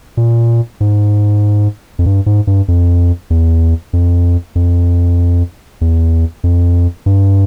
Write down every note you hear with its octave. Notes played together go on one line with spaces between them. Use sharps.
A#2
G#2
F2
G2
G#2
G2
F2
E2
F2
F2
E2
F2
G2